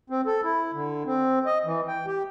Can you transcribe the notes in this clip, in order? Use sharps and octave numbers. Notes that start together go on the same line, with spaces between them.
C4
A4
E4
D3
C4
D#5
E3
G5
G4